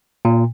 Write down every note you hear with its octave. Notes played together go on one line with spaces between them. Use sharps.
A#2